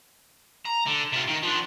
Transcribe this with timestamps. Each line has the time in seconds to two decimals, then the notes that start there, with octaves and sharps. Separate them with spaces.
0.66 A#5
0.86 D3
1.13 C3 F4
1.28 D#3
1.43 F3 D4